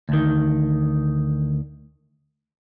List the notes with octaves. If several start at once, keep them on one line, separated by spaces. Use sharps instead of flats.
D2 D#3